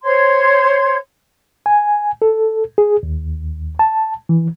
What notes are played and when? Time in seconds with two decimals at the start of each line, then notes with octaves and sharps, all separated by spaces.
0.04 C5 C#5 C6 G#6
1.66 G#5
2.22 A4
2.78 G#4
3.03 D#2
3.79 A5
4.29 E3